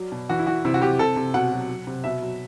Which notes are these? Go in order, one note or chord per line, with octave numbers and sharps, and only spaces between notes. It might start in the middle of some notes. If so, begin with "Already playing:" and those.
Already playing: F#3 D5
B2
E3 F#4
E4
E3 F#4
C3 E4
F#4
C3 G4
C3 A4
C3
B2 F#5
F#3
F#3
C3
B2 E5
F#3